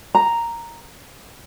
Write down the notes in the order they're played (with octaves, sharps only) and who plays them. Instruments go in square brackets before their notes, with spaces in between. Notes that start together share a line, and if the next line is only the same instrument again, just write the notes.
[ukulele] A#5